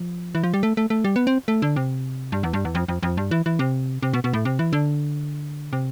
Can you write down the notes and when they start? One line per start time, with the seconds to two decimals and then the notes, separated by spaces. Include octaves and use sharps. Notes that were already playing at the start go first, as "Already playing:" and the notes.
Already playing: F3
0.35 E3
0.44 F3
0.54 G3
0.63 A3
0.77 A3
0.90 A3
1.04 G3
1.16 B3
1.27 C4
1.48 A3
1.62 D3
1.76 C3
2.32 G2
2.43 E2
2.53 G2
2.65 E2
2.75 F2
2.88 F2
3.03 F2
3.17 G2
3.31 E3
3.46 E3
3.59 C3
4.02 C3
4.13 B2
4.24 B2
4.33 A2
4.45 C3
4.59 E3
4.73 D3
5.73 C3